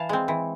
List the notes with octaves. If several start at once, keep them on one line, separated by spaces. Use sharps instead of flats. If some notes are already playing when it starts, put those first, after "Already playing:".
Already playing: E3 F5 A5
G#3 C4
E3